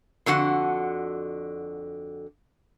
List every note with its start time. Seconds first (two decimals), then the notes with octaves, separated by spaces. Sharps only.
0.26 F2 D3 F#4 F#5